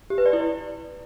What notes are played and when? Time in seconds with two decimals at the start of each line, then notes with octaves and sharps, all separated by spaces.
0.10 G4
0.18 B4
0.26 D5
0.33 E4
0.41 D5